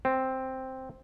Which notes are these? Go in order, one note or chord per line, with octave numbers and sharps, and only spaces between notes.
C4